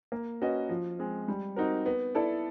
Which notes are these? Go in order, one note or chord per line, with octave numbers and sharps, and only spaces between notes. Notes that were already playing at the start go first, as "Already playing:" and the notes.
A#3
C#4 F#4 B4 D#5
F3
G#3 C4
G3
C4 D#4 F#4 A#4
B3
E4 A4 D5